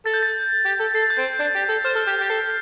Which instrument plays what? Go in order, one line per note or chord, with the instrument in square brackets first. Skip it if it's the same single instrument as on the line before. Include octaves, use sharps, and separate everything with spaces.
[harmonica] A4 [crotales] A6
[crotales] G6
A6
[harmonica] G4
A4
[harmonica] A4 [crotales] C7
[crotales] A6
G6
[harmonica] C4 [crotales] A6
[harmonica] D4 [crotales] G6
[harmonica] G4
A4
[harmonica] C5 [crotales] F6
[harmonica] A4 [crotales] F6
[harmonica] G4 [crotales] G6
[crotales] G6
[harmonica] G4
[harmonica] A4 [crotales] C7